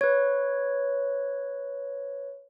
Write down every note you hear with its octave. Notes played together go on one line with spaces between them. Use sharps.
B4 C#5